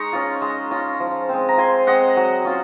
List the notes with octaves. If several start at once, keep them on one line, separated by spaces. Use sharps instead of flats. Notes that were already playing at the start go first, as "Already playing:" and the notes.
Already playing: G#3 D#4 A#5 C#6
C#4 F4
G#3
C#4 F4
F3
G#3 C4
A#5
F3 G#5 C6
G#3 C4 D#5 F#5
F#3
C#4 F4